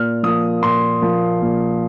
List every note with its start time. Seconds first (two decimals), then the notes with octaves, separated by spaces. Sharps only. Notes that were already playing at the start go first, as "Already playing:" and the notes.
Already playing: A#2 F6
0.23 F3 A#3 D#6
0.62 A#2 C6
1.02 F3 A#3
1.41 A#2